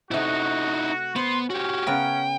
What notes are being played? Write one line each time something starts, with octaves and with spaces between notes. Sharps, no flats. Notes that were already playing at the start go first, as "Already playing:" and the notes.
C3 A3 D#4 E4 F#4
B3 C5 C6
C#4 F#4 G4
C#3 B3 A#4 G5